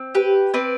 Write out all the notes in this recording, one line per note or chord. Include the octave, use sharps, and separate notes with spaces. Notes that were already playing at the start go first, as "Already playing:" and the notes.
Already playing: C4
G4 B4
C4 B4 D5